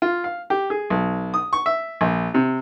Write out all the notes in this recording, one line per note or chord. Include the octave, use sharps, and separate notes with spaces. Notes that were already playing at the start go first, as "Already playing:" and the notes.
F4
F5
G4
G#4
B1
D#6
C#6
E5
A#1
C3